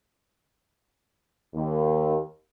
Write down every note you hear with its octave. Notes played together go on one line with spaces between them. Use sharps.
D#2